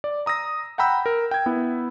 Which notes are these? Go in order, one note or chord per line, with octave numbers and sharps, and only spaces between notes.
D5
A#5 D#6 E6 A#6
F#5 G5 A#5 B5 E6 G6
A#4
G5 G#6
B3 E4